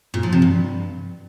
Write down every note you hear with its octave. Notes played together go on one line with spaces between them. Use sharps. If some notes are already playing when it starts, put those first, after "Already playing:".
A#2
F3
C3
G2